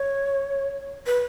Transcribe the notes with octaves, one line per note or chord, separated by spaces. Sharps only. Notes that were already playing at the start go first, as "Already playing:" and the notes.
Already playing: C#5
B4